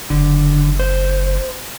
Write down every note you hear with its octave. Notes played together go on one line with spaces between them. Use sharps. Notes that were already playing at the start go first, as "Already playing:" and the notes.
F#1 D3
C5